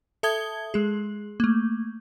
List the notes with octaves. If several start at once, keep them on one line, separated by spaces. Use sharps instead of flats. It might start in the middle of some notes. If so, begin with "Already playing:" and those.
A4 E5 A5 D#6 G#6 G7
G#3 G#4
A3 A#3